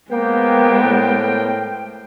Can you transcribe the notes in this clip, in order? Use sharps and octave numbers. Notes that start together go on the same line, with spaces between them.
G#3 A#3 B3 A#4 C5 G5
A2